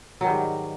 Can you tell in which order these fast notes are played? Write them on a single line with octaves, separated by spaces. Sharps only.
F#3 D#3 G3 G#2